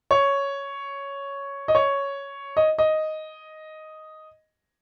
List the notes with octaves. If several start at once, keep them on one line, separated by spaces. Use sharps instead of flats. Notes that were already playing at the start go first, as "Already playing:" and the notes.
C#5
D#5
C#5
D#5
D#5